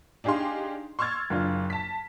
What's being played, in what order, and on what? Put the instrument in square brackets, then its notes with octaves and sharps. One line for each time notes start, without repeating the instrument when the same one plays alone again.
[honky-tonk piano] D4 D#4 G4 G#4 F5 C6
C6 C#6 E6 F6 G#6 A6
F#1 D4 F4
A5 B6